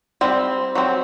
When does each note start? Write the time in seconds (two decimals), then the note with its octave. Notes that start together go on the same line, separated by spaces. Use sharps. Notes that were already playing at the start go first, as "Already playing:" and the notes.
0.21 G3 C4
0.75 F#3 C4